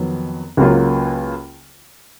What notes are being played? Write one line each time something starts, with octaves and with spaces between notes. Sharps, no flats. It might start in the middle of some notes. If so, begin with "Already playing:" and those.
Already playing: F2 D#3 F#3 B3
C#2 C#3 F#3 A#3 F4